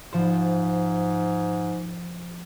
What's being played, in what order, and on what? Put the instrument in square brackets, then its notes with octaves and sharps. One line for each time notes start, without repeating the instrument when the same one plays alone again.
[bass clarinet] G#2 [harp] F3 C5